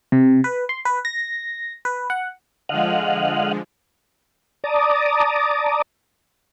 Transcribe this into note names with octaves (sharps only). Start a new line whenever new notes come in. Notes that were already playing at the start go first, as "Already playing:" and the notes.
C3
B4
C6
B4
A#6
B4
F#5
D3 F3 G#3 D#5 F5 F#5
D5 A5 A#5 D6 D#6